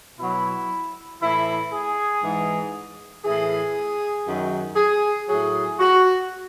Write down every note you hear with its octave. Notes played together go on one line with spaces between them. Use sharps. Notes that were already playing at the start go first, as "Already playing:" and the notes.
B2 F#3 E4
A2 E3 E4
G#4
G#2 E3
A2 E3 G#4
F#2 D#3 F#3
G#4
A2 F#3 G#4
F#4